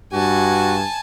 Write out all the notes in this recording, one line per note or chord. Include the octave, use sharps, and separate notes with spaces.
G2 F#4 G#5 A5